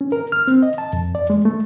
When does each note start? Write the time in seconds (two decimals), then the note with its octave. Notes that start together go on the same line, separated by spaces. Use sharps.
0.01 C#4
0.12 A#4
0.32 F6
0.48 C4
0.63 D#5
0.78 A5
0.93 F2
1.15 D5
1.30 G#3
1.45 A3